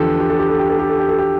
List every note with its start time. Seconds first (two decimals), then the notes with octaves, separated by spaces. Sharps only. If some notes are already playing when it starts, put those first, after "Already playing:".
Already playing: E2 D3 F3 G4 A4
0.20 G4
0.30 A4
0.39 G4
0.49 A4
0.59 G4
0.69 A4
0.79 G4
0.90 A4
0.99 G4
1.09 A4
1.19 G4